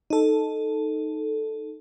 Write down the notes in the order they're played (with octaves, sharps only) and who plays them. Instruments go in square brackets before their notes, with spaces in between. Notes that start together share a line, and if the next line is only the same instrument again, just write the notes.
[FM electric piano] D#4 A4